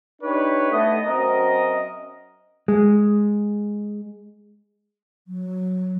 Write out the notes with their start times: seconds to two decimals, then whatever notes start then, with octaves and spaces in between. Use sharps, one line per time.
0.22 D4 D#4 G4 B4 C#5
0.71 A3 B3 D#5
1.06 F#2 C4 A#4 D#5
2.68 G#3
5.28 F#3